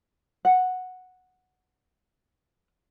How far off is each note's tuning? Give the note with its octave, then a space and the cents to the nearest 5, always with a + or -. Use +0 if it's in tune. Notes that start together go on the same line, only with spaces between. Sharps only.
F#5 -5